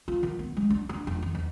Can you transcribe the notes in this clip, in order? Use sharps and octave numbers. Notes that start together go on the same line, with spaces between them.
F4
D#3
B3
G#3
D4
D4
F1
D#3
E2